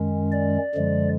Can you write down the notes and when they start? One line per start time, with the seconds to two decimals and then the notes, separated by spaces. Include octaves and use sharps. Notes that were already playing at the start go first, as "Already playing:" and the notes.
Already playing: F#2 D#3 G#3 C#4
0.32 D5
0.75 F#2 D3 F3 G#3